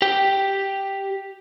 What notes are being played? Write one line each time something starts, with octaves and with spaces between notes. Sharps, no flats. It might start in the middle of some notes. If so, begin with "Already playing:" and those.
G4 G5